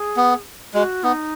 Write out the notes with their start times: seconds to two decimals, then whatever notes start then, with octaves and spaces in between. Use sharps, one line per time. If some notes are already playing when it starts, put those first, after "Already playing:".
Already playing: G#4
0.17 B3
0.74 G#3 F#4
1.04 B3 D#4